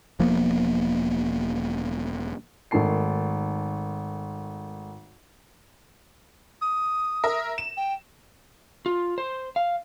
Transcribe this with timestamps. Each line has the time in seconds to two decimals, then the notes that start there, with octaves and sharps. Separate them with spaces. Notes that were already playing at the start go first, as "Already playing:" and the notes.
0.20 E1 F3 A#3 B3
2.71 G#1 D#3 A3 A5 C7
6.61 D#6
7.24 A#4 E5
7.58 E7
7.77 G5
8.86 F4
9.18 C5
9.56 F5